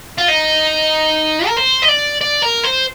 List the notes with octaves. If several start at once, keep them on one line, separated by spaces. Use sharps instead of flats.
F4
D#4
A#4
C5
D#5
D5
D5
A#4
C5